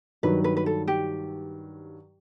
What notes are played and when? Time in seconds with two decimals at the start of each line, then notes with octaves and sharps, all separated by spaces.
0.23 G2 D#3 F#3 B4
0.44 B4
0.57 B4
0.66 A4
0.88 G4